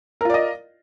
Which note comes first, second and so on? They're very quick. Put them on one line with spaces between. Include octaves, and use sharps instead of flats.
A#4 F4 D5 D#5